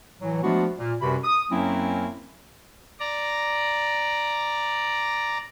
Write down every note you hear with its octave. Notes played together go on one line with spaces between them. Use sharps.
A2 E3 F#3
F3 G#3 A3 B3 D4 F#4
A#2
F#2 C3 G3 F#4 B4 B5
D#6
F#2 F#3 A#3 C4 C#4 E4
D5 A#5